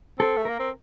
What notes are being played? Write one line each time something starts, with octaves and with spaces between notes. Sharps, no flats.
C4 A4
A3
A#3 A#4
C4